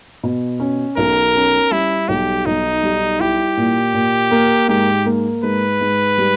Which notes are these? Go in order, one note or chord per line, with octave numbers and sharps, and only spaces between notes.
B2
C#4
B1 A#4
C#4
G3 E4
B1 G4
B1 D#4
G3
E4 G4
A#2
A#2
A#3
G#2 G4
A#3
G#2 B4
G#2
G3